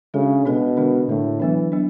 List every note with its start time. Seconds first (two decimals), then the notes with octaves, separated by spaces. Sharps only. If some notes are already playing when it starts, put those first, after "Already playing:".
0.14 C#3 G#3 D4 F#4 A4
0.45 B2 G#3 D4 F#4 A4
0.77 D3 G#3 D4
1.09 A2 D3 G#3 D4
1.40 E3 F#3 B3 D4
1.72 F#3 B3 D4